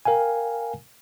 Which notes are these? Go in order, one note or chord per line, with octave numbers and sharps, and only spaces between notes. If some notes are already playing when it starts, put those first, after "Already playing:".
A#4 F5 G5 G#5